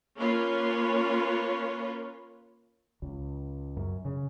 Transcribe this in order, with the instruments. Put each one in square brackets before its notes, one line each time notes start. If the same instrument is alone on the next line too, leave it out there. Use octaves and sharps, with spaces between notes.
[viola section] A#3 C#4 F4 B4 C#5
[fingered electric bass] C#2
F#2
C#3